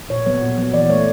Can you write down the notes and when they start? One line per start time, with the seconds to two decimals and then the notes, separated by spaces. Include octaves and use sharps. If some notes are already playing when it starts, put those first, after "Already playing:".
0.10 A#2 C#5
0.26 F#3 B3 C#5
0.42 A#2
0.58 F#3 B3
0.73 E3 D5
0.89 A3 C#5